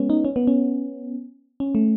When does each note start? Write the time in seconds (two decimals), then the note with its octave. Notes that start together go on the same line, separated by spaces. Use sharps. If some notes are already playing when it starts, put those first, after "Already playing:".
Already playing: G#3 B3 C#4
0.10 D#4
0.25 C#4
0.36 B3
0.47 C#4
1.60 C#4
1.75 A3